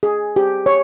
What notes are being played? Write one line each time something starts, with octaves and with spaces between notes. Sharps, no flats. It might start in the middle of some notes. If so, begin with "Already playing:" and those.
G#4
G4
C#5